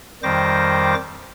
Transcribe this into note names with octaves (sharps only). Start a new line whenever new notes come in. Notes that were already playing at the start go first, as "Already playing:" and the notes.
F2 D#3 G3 C5 D6 A#6